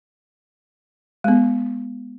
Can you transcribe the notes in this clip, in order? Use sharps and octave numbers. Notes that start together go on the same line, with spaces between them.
G#3 B3